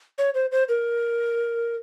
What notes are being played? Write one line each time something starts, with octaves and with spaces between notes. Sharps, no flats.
C#5
C5
C5
A#4